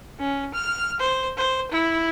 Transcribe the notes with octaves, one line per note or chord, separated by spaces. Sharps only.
C#4
F6
C5
C5
E4